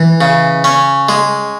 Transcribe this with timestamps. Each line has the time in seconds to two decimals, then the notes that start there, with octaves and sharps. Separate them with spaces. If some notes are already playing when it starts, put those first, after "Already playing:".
Already playing: E3
0.21 C#3
0.64 C#4
1.09 G#3